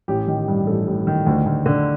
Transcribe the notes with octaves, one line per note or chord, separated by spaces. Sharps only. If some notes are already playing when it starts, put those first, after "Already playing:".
A1 G4
D#3
G2
A1 A4
A1
D#3
D2
D2
D3